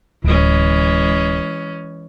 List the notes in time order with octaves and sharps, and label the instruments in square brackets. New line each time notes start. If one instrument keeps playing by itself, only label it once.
[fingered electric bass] D1 [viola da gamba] E3 G#3 C#4